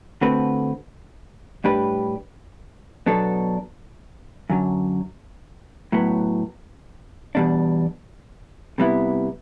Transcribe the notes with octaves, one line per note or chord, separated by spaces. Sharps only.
D3 A3 C4 F#4 B4
A2 G3 D4 G4 B4
B2 F#3 B3 D4 A4
F#2 D3 F#3
A2 F#3 B3
E2 B2 G3 D4
C3 G3 B3 E4